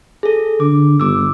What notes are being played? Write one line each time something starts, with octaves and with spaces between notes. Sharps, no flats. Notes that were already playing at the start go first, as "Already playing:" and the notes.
G#4 A4
D3 D6
G1 D6 E6